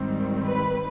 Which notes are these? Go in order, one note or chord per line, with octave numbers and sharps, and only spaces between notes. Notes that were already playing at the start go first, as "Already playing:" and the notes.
Already playing: G#2 D#3 G3 C4
B4